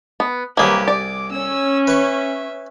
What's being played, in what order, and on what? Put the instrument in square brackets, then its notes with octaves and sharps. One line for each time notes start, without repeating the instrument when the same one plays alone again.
[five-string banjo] B3
[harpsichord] C2 G#4 [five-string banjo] F#3 G#3 A#3 [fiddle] G4 B4
[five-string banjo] D5 [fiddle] D6
[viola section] C#4 [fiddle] E6
[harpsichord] B4 C#6 [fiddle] E5